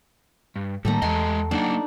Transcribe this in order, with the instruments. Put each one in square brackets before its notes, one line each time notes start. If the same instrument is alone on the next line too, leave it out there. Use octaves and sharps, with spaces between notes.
[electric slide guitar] G2
[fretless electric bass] A2 D#3 A#3 [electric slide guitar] G3 [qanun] A3 A4 A#5
[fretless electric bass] E2 [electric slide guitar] G#3 A4 D#5 [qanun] G5 C6
[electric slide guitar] F#3 A#3 F#5 [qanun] D4 D#4 D5